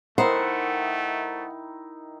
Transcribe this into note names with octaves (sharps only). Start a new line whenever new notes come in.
D#3 A3 D#4 E4 A#4 C5 F#5